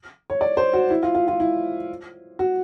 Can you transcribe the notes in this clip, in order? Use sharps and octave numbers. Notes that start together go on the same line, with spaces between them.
C#5
D5
C5
F#4
E4
F4
F4
F4
E4
F#4